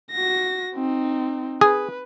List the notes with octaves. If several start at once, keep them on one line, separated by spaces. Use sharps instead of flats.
F#4 A#6
C4 D#4
G#4 B4